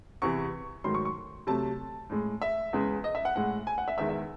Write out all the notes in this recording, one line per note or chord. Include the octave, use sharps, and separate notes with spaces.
E2 C3 E3 C#6
G#2 D#3 F#3 A3 C6
C#6
C#6
C3 F#3 A3 A5
A2 G#3
E5
E2 C#3 G#3
D#5
E5
F#5
A2 G#3 F#5
G#5
F#5
E5
E2 D#3 G#3 E5
E5